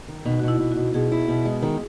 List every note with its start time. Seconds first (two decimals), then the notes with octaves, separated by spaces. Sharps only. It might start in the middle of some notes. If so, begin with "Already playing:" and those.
0.08 D#3
0.25 B2 D#4
0.39 B2 F#4
0.48 E4
0.60 B2
0.72 B2 F#4
0.94 B2 G#4
1.12 E4
1.28 B2
1.45 G#3
1.62 D#3 G#4